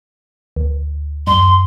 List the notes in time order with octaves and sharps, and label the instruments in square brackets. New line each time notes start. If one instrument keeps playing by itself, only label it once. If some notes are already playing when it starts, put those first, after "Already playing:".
[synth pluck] D2
[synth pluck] F#2 [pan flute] C6